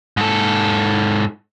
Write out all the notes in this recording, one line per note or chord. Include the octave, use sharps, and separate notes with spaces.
G#2 A4